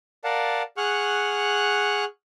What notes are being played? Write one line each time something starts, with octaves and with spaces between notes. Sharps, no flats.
A#4 D5 F5 F#5 A5
G#4 F#5 C#6 F6 F#6